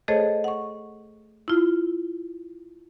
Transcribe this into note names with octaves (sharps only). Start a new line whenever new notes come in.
A3 G#4 A4 C5 C#5 D#5
F#5 C#6
E4 F4